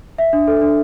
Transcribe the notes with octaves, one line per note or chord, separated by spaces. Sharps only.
E5
D4
A4
D4